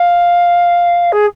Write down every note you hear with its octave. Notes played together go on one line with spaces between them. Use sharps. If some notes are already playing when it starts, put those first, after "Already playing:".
Already playing: F5
G#4